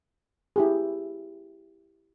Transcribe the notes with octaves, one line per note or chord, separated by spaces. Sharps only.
E4 G4 G#4